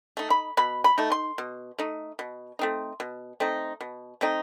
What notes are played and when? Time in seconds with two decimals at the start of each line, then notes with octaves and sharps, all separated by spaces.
0.17 A3 D#4
0.30 B5
0.57 B2 B5
0.84 B5
0.98 A3 D#4
1.12 C6
1.38 B2
1.79 A3 D#4
2.19 B2
2.59 A3 C4 D#4
3.00 B2
3.40 A3 C4 D#4
3.81 B2
4.21 A3 C4 D#4